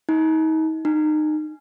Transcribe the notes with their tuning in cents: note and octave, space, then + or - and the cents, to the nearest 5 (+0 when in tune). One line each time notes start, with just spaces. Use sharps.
D#4 +35
D#4 -25